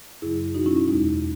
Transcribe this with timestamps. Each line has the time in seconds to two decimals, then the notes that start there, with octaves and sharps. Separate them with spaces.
0.22 F#2 C#3 F#3 E4 G#4
0.55 B2 F#3 D#4 F#4
0.66 C#4 E4
0.77 C#4 E4
0.88 E2 B2 G#3 D#4